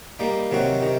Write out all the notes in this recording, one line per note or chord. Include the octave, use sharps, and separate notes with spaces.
G3 A#3 D#4
C3 D#3 F#3 C4 F#4
C3 D#3